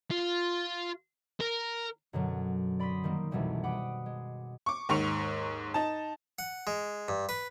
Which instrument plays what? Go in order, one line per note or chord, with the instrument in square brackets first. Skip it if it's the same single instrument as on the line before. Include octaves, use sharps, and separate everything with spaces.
[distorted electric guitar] F4
A#4
[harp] F#2 B2 D3 F#3
D5 B5 C6 D#6 B6
D#3 G3 A#3
C2 F2 B2 E3 G3 A#3
F#5 G5 B5 D6 D#6
G#3
[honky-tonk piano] C#6 D6
D#2 G#2 C#6 F7
D#4 A5
[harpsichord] F#5
G#3
G2
B4